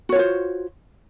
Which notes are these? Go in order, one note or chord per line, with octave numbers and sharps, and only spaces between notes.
F4 F#4 C5 C#5